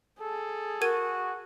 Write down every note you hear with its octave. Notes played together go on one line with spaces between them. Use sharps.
G#4 A4
F#4 A#4 G#6 D#7